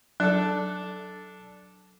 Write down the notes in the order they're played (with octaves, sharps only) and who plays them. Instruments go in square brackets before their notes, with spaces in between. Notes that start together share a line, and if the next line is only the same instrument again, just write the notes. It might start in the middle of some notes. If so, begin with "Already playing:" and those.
[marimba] F#3 [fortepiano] D4 A4